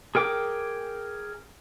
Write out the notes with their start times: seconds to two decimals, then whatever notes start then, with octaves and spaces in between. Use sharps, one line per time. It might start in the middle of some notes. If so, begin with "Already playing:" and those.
0.15 G#4 A#4 G5 D6